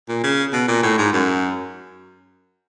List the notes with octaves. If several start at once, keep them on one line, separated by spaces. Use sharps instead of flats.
A#2
C#3
B2
A#2
A2
G#2
F#2